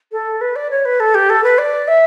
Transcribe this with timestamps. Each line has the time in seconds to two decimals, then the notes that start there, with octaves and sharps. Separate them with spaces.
0.12 A4
0.41 B4
0.56 D5
0.71 C#5
0.85 B4
1.00 A4
1.15 G4
1.30 A4
1.44 B4
1.58 D5
1.88 E5